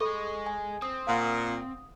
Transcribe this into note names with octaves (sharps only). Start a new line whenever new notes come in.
G#4 A4 D#5 B5 C#6
G#5
C4 D#6
A#2 F5 F#5 C#6